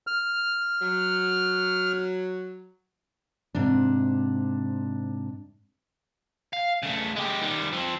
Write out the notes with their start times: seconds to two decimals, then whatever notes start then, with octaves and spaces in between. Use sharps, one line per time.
0.07 F6
0.82 F#3
3.55 G#2 C3 D4
6.53 F5
6.83 C#3 A3
7.16 G#3 G4
7.42 D#3 G3
7.73 F3 C4